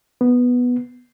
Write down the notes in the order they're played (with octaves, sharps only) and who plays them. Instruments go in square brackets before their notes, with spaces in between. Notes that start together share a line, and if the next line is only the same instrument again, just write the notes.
[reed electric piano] B3